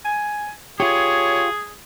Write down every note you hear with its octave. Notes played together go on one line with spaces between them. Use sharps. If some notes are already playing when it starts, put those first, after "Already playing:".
G#5
F4 G4 G#4 C#5